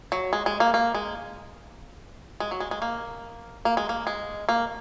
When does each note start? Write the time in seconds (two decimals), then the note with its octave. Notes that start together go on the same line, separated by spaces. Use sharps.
0.12 F#3
0.33 G#3
0.46 G#3
0.60 A#3
0.74 A#3
0.95 G#3
2.40 G#3
2.51 F#3
2.60 G#3
2.71 G#3
2.82 A#3
3.65 A#3
3.77 G#3
3.89 A#3
4.07 G#3
4.49 A#3